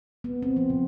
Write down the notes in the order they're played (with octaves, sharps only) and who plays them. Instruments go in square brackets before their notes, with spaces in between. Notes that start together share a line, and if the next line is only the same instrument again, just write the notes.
[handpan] B3
C4
F3
C#3